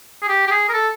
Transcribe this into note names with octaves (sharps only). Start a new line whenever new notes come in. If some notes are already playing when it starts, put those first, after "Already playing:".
G#4
G4
G4
G#4
A#4
A4